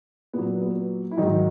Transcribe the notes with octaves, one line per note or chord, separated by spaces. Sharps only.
A#2 F#3 B3
B3
E4
G#2 D#3 F#3 D#4